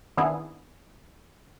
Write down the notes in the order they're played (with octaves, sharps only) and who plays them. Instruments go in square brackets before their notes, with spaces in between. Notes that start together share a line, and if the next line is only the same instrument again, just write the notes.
[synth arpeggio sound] D#3 B3 C4 D4 E4 G#4